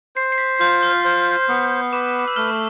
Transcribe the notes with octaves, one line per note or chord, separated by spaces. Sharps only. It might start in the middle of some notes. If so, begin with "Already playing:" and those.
C5 C7
C7
B6
F4 G6
F6
C5
B3
B4 D6
D6
E6
A3 F6